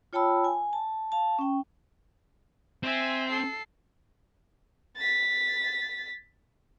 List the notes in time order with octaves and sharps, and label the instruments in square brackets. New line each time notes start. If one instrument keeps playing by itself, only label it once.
[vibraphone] F4 C#5 G5 A5 B5 E6
G#5
A5
F5 A5
C#4 G5
[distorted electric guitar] C4 [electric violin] E5 G#5
[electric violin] A4 C7
[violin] A6 B6